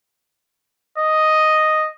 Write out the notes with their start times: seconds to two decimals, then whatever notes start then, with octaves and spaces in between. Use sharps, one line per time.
0.98 D#5